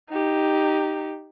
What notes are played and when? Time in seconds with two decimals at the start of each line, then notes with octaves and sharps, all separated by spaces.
0.10 D#4 G4